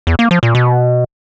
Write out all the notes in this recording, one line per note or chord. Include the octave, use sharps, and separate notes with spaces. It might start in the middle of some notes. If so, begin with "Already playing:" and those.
E2
A#3
F3
A#2
B2